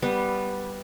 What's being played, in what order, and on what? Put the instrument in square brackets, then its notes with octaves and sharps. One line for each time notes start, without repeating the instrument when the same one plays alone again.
[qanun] G3 B3